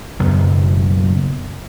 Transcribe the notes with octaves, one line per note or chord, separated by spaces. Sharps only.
B1 F#2 C#3 B3